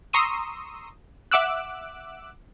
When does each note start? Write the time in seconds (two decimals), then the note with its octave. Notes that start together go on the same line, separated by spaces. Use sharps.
0.13 A#5 C6 C#6 D#6 E6
1.31 E5 F#5 D6 E6 F#6